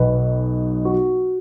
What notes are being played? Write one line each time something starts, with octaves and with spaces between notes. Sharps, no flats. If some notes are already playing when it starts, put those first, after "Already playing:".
Already playing: B1 B2 B3 B4
F#4